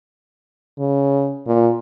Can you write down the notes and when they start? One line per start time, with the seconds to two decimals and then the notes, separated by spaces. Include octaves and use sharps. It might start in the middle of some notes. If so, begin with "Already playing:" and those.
0.79 C#3
1.47 A#2